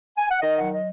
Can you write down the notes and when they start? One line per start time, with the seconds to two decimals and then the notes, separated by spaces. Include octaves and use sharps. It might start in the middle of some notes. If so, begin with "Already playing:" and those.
0.17 G#5
0.30 F#5
0.41 D#3 D#5
0.57 F#3 F#5
0.72 D#5